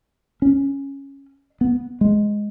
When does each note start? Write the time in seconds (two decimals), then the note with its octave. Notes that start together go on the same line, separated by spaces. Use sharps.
0.42 C#4
1.61 B3
2.01 G#3